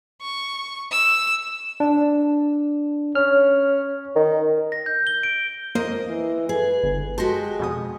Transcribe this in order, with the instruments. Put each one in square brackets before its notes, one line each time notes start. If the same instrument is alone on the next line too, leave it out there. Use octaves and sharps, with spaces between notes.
[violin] C#6
E6
[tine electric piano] D4
[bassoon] C#4 [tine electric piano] F6
[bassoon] D#3
[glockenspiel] A#6
G6
G7
D7
[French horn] F2 [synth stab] A#3 A#4 C5 [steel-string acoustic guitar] D#5
[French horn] E3
[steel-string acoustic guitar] G#4 [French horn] B4
[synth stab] G1
[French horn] G#3 [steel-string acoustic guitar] F#4 G4 [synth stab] A5 C6 A#6
[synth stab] F2 B2 D#6